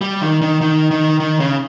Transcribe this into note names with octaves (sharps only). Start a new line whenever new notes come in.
G3
D#3
D#3
D#3
D#3
D#3
C#3